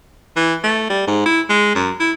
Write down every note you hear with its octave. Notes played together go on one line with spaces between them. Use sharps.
E3
A3
G3
G#2
E4
G#3
F#2
E4